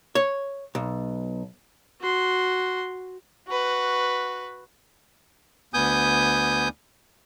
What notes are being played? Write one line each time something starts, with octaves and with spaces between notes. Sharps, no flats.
C#5
B1
F#4 C6
F#4 B4
D2 B3 G#5 D#6 G6